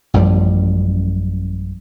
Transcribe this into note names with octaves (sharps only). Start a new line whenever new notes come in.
A1 F#2 F3 G3